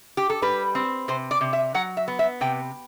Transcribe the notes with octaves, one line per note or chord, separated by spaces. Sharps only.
G4
A4
G3 B4
C4
C3 C5
D5
C3
E5
F#3 F#5
E5
B3
E5
C3 G5